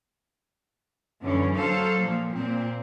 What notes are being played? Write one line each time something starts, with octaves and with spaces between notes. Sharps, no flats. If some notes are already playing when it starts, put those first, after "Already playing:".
F#2 D3 E3 C#4
F#3 A4 C5 F5
A#2 F3
A#2 C4